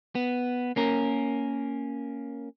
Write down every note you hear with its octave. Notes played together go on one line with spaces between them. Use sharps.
B3
A#3 C#4 A#4